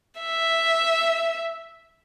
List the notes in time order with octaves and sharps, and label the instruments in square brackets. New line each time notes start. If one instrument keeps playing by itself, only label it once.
[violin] E5